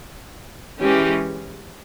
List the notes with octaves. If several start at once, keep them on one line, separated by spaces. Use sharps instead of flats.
E3 G#3 C#4 G4